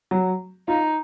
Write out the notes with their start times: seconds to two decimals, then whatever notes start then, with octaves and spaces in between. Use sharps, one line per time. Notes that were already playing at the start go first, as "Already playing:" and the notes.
0.11 F#3
0.68 D#4 F4